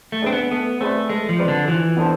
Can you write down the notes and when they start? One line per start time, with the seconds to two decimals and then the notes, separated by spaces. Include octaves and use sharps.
0.12 A3
0.22 C4 D4 G#4 B4
0.32 B3
0.51 A3 B3
0.80 A3 C4 G#4 B4 D5
1.10 G#3 A3
1.29 F3
1.38 C4 G#4 B4 D5
1.48 D3
1.68 E3 F3
1.97 B3 D4 A4 C5